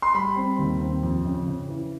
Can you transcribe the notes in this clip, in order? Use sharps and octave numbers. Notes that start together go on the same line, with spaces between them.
C6
G3 B5
C4
D#2
C4
F2
C#3
C#3
E3